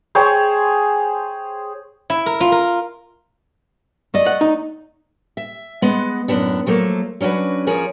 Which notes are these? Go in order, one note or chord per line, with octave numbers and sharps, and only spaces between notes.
G#4 C5 C#5 G5
E4
A#4
F4
A#4
A3 D5 D#5
F#5
D#4
E5
G#3 B3 D#5 F#5
F#2 A2 B3 D4
F3 F#3 A3 A#3
F#3 C#4 D4 F#4 B4
F3 C#4 G#4 A#4